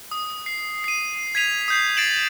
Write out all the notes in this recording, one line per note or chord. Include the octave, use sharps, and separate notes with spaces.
D#6
C7
C7 D#7
G#6 B6 D#7 F7
D#6 G6 C7
A6 C7 D7 E7 F#7